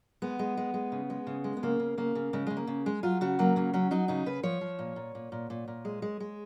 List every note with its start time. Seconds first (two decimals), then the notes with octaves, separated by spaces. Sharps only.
0.22 G#3 B3
0.39 G#3
0.57 G#3
0.74 G#3
0.92 C#3
1.10 G#3
1.27 C#3
1.44 G#3
1.57 B3
1.63 C#3 A#3
1.80 C#3
1.97 C#3 A#3
2.15 C#3
2.33 C#3 G#3
2.47 C#3 G#3
2.57 A#3
2.67 C#3
2.86 G#3
3.03 F#3 F4
3.21 C#3 F#4
3.39 F#3 A#3
3.56 C#3 A#3
3.73 F#3 C#4
3.91 F#3 D#4
4.08 C#3 D#4
4.26 C#3 B4
4.43 F3 C#5
4.61 F3
4.79 A#2
4.96 A#2
5.15 A#2
5.32 A#2
5.50 A#2
5.68 A#2
5.85 G#3
6.02 G#3
6.20 G#3